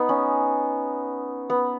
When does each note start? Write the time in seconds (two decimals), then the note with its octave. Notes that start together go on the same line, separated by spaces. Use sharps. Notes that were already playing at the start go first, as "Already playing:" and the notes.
Already playing: B3 D#4
0.09 C#4
1.50 B3